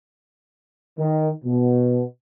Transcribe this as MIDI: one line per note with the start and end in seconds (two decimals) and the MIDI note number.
0.99 1.29 51
1.45 2.02 47